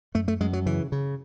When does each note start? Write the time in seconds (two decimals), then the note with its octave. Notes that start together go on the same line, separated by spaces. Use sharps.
0.15 F#2 A3
0.28 A3
0.40 F#2 G#3
0.53 F#3
0.66 C#3 E3
0.92 C#3